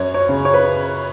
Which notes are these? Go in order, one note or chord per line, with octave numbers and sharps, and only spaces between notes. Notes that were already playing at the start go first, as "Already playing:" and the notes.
Already playing: F#2 C#5
C#5
C#3
C#5
B4